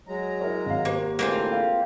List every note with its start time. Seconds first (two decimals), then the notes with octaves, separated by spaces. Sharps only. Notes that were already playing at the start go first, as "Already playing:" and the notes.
0.08 F#3 G#3 A#5
0.41 E4 A#4 C#5
0.66 G#1 F5
0.85 A#3 G4 C5
1.19 A2 D3 E3 G#3 A#3 C4 F4
1.53 F5